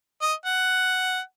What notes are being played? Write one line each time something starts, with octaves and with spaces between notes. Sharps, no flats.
D#5
F#5